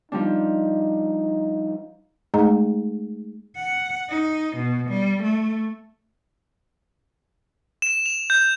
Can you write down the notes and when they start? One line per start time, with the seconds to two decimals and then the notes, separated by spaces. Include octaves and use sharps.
0.12 F3 G3 D4 D#4
2.34 G#3 A3 D#4 G#4 D#5 A#5
3.56 F#5
4.09 D#4
4.56 B2
4.89 G3
5.23 A3
7.82 E7
8.06 F7
8.30 G6